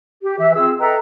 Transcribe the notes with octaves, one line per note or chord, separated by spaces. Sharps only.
G4
E3 E5
C4 F4 G#4 E6
A4 B4 D#5 E5 G5 A#5